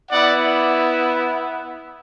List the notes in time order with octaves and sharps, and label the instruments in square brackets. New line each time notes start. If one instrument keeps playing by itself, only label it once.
[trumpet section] B3 E4 D5 F#5